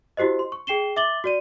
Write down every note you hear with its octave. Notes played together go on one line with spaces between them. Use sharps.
E4 F#4 G4 C5 D#5
C6
C#6
G#4 G5 C7 E7 G7
E5 D6 A6 F#7 G7
F#4 D5 D#7